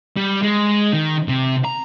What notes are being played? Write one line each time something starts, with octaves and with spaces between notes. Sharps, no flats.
G3
G#3
D#3
C3
A#5